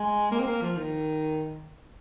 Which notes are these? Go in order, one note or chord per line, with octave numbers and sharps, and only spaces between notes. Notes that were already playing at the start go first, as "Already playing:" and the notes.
Already playing: G#3
A#3
C4
A#3
F3
D#3